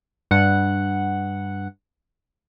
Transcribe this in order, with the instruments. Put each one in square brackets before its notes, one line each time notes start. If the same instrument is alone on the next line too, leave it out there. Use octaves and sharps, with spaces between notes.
[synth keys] G2 F#5